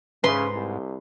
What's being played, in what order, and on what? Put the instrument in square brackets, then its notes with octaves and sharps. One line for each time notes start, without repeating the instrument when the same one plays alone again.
[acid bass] G#2 [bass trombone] C#3 [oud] B4 [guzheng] C6
[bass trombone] C2